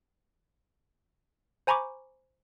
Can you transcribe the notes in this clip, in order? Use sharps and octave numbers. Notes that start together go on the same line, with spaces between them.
C5 G#5 A#5 B5 C#6 D6